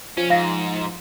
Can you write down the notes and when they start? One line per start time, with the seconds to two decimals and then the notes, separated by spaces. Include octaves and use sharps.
0.17 F3 C#4
0.30 G#2 F5 A#6